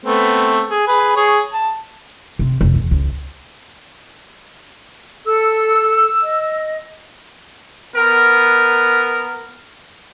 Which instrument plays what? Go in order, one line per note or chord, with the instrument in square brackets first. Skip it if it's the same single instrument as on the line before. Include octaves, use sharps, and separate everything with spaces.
[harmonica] A3 B3 C4
G#4
G#4 B4
G#4 C#5
A5
[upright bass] C3
F1
E2
C#2
[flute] A4 [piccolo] E6
[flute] D#5
[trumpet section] B3 A#4